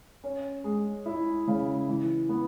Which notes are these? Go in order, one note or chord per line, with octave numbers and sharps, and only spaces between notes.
C#4
G#3
E4
C#3
E3
B3